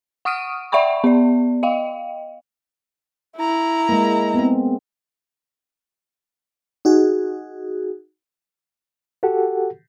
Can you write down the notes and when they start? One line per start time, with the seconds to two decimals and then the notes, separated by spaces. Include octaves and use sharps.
0.25 F#5 C#6 D#6 F6 D7 D#7
0.72 D5 E5 F#5 G5 B5 C#6
1.04 B3 D5
1.63 D#5 F5 G5
3.37 E4 A#5
3.89 G#3 A#3
4.34 B3 C4
6.85 D#4 F#4 G#4
9.23 F#4 G4 A4 F#5